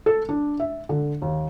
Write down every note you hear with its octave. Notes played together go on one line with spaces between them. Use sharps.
A4
D4
E5
D3
D#2